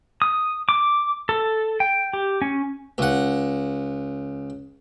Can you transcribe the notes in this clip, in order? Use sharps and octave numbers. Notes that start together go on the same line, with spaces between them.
D#6
D6
A4
G5
G4
C#4
C#2 F#5